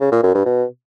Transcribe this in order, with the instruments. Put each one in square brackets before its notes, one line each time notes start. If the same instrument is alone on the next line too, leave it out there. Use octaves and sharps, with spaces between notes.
[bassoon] C#3
A#2
F#2
G2
B2